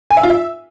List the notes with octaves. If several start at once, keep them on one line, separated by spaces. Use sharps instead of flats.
G#5
E5
F4
E5